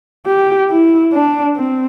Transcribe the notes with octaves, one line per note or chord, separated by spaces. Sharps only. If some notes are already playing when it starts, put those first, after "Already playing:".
G4
E4
D4
C4